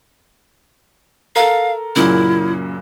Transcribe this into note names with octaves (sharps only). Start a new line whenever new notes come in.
A4 A#4 F5
F#2 A#2 C#3 E4